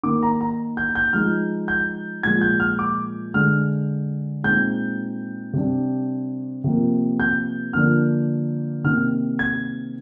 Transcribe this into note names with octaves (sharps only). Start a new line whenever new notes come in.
D#3 A#3 D#4 D6
A#5
A#5
G6
G6
F3 G#3 D#4 F6
G6
A#2 F3 G#3 G#6
G6
F6
D6
D3 G#3 D4 F6
A#2 G#3 C4 D#4 G6
C3 G3 D4
C3 F3 A#3
G6
D3 F3 A#3 D4 F6
C3 D#3 A#3 F6
G#6